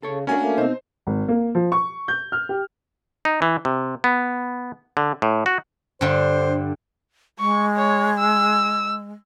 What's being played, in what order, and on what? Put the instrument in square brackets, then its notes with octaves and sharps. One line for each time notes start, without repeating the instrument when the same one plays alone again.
[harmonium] C#3 [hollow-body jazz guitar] A4 C#5
[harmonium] A3 A#3 [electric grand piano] C#4 G#5 [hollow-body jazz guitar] D4 F#4 A#4
[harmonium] A3 A#3
[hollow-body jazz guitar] B2 [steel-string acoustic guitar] C4 D#4 [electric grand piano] C5
[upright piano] G#1
A#3
F3
C#6
G6
F6
G4
[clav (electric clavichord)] D#4
E3
C3
B3
D3
A2
F#4
[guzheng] G2 D3 [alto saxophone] C5
[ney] G#3 [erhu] C#6
[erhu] C#5
E6